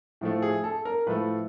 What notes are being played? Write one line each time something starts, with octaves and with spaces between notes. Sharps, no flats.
A2 F3 A3
G#4
A4
A#4
A2 F3 A3 B4